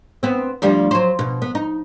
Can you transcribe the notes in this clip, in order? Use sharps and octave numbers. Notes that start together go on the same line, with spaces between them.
B3 C4
D2 F3 G3
F#3 C5
B2
B3
D#4